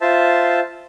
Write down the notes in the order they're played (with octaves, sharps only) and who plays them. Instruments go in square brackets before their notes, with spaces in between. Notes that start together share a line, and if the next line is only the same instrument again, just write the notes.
[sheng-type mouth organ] F4 C5 E5 A5